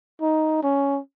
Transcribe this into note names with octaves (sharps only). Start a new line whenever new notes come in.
D#4
C#4